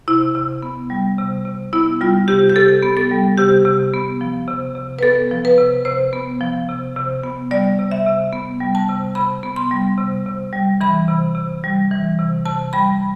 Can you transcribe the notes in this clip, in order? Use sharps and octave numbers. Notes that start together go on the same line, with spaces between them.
C3 E4
C3
B3
G3
C3
C3
B3 E4
G3 F4
C3 G4
G4
C3 A4
B3
A4
G3
C3 G4
C3
B3
F3
C3
C3
B4
B3 A4
F3
B4
C3
C3 C5
B3
F3
C3
C3
B3
G3 D5
C3
E5
C3
B3
G3
A5
C3
C3 B5
B3
C6
G3
C3
C3
G3
E3 B5
C3
C3
G3
E3
C3
C3 A5
G3 B5